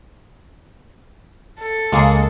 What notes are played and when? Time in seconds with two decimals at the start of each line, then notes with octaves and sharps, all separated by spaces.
1.61 A4
1.92 C#2 G#3 A#3 G#4